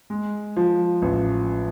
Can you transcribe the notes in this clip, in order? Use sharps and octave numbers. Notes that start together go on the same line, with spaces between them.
G#3
F3
A1